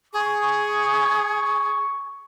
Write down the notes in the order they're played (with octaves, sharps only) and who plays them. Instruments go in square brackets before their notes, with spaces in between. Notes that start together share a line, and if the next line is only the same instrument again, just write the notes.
[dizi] G#4 [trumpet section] C#6